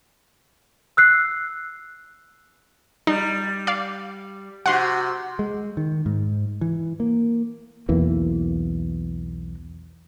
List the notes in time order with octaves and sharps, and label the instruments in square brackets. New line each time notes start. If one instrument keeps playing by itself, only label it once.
[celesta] E6 F#6 C7
[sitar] G3 [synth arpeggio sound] D#4
[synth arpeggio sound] D5 F5
[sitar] C3 F#4 [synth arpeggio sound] F#5 C6
[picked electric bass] G#3
D#3
G#2
E3
A#3
[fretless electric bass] B1 E2 E3 A#3